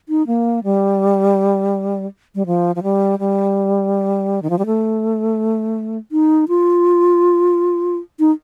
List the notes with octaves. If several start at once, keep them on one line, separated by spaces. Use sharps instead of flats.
D#4
A#3
G3
G3
F3
F3
G3
G3
D#3
F3
G3
A3
D#4
F4
D#4